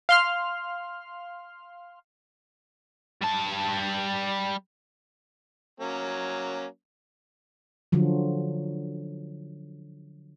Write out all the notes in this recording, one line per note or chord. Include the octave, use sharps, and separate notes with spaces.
F5 C6 F6
G3 A5
F#3 A#3 C#4
D3 F3 F#3